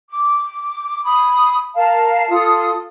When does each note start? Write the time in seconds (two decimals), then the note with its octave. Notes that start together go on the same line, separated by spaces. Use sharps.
0.10 D6
1.03 B5 D#6
1.75 A#4 F5 A5
2.29 F4 A4 D#6